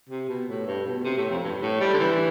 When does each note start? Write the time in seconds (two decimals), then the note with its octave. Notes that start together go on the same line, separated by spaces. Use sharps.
0.10 C3
0.29 B2
0.48 A2
0.67 G2
0.86 B2
1.05 C3
1.17 A2
1.30 F2
1.43 G2
1.62 A2
1.80 G3
1.94 D3
1.99 E3